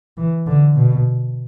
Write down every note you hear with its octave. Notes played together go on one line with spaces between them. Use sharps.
E3
D3
B2